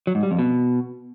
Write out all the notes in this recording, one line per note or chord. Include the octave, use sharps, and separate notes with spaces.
F#3
G#2
G3
F2
B2